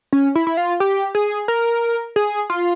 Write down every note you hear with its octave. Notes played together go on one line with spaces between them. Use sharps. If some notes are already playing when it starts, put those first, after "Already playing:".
C#4
E4
E4
F4
G4
G#4
A#4
G#4
F4